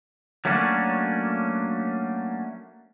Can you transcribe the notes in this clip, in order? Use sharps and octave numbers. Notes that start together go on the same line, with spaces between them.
F#3 A3 A#3 C#4 D4